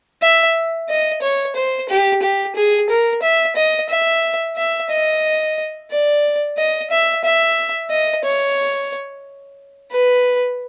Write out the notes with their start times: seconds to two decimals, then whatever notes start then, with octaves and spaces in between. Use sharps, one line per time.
0.22 E5
0.89 D#5
1.22 C#5
1.56 C5
1.89 G4
2.22 G4
2.56 G#4
2.90 A#4
3.22 E5
3.56 D#5
3.89 E5
4.57 E5
4.90 D#5
5.91 D5
6.58 D#5
6.91 E5
7.24 E5
7.91 D#5
8.24 C#5
9.92 B4